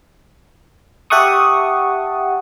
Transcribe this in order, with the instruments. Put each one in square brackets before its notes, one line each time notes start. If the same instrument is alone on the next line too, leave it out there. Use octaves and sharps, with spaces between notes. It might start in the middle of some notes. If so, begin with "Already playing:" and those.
[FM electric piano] G4 E5 F#5 A5 C#6 D#6